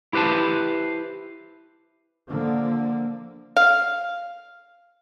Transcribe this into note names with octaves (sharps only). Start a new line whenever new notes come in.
E4 G4 B4 C5 A5
D3 F3 A#3
F5